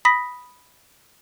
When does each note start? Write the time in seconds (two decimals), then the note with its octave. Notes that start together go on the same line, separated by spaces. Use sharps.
0.05 B5 D#6 A#6 B6